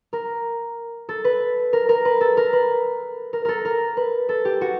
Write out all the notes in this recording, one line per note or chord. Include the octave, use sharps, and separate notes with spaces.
A#4
A4
B4
A#4
A#4
B4
A4
A#4
B4
A#4
A4 A#4
A#4
B4
A4
G4
F#4